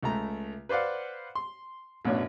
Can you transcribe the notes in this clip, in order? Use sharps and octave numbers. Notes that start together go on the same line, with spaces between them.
C#2 A3 A#5
B4 C5 D5 F5 F#5
C6
A1 F#2 B2 D4 C#5